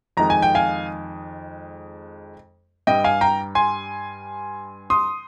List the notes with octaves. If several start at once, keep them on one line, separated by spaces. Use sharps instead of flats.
F2 D#3 G#3 A#5
G#5
G5
F5 G#5
G2 G3 D#5 G5
F5 G#5
G5 A#5
G#5 C6
C6 D#6